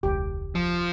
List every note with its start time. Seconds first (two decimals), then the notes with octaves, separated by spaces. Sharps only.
0.03 E1 C#2 G4
0.55 F3